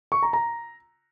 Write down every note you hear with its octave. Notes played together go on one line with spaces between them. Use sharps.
C#6
A#5
A#5